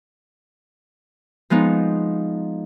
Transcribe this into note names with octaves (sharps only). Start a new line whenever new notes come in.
F3 G#3 B3 D#4